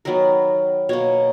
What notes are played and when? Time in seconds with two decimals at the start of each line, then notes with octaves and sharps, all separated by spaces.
0.05 D#3 F#3 B3 A#4
0.89 B2 A#3 C#5